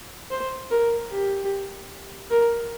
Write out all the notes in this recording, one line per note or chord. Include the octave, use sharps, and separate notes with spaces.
C5
A#4
G4
A#4